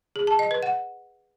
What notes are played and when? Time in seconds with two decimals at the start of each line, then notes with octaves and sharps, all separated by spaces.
0.16 G#4
0.27 A5
0.39 D#5
0.51 B4
0.63 F#5